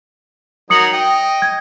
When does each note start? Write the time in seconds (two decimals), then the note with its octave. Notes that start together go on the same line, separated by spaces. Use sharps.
0.70 F#3 D#4 A#4 D#6 C#7 F#7
0.92 D#5 G5
1.42 G#6